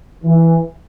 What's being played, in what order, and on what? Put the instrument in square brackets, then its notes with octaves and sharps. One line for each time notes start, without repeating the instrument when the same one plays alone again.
[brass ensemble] E3